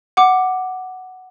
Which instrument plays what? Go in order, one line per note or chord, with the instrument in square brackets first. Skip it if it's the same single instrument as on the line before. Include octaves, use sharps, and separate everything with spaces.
[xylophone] F#5 D6